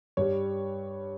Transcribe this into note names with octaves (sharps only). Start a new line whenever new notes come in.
G2 G3 C#5